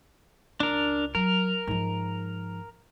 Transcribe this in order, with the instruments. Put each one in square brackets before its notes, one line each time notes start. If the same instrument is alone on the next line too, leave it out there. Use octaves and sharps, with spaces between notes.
[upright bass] C#2 [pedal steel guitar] D4 A#4
[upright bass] F#3 [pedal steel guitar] A#4
[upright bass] G#2 F3